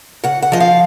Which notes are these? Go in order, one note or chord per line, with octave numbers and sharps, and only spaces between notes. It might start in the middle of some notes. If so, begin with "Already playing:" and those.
C#3 F#5
F#5
F3 D#5
F5